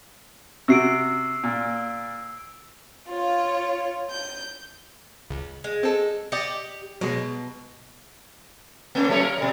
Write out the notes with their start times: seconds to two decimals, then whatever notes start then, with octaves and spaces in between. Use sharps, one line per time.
0.68 C3 F#4 E6 C7 D7
1.44 A#2
3.09 F4 C#5
4.10 G6
5.31 C#2
5.64 G#3
5.83 C4 A4
6.32 G4 D5 D#5 C#7
7.01 B2 F#3 G#3
8.95 A3 C#4
9.09 F#3 A3 C#5
9.21 A#4
9.38 B2 G3